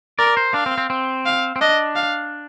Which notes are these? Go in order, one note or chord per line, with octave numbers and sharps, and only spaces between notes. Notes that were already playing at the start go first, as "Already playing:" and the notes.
A#4 D5
C5
D4 F5
C4
C4
C4
F5
C4
D4 D#5
F5